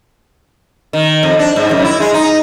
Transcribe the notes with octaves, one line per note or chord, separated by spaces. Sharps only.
D#3
F2
D4
G#2
F#2
E4
G#3
D#4